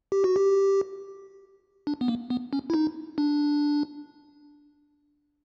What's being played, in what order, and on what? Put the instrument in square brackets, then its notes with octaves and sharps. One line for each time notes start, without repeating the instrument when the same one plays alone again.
[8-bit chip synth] G4
F#4
G4
D4
B3
A#3
B3
C#4
E4
D#4
D4